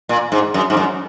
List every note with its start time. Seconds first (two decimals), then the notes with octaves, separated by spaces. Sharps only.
0.09 A#2
0.32 G#2
0.54 F#2
0.70 G#2
0.77 F#2